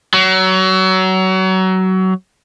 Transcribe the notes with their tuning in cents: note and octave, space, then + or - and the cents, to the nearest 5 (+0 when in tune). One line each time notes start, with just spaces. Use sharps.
F#3 +25